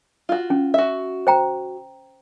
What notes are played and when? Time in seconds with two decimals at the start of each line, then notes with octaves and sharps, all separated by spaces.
0.29 F4 F#4
0.50 C#4
0.74 F#4 E5
1.27 C5 G5 A#5